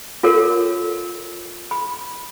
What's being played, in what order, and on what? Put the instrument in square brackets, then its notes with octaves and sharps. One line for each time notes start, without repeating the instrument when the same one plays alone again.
[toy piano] F4 A4 A#4 C#5
B5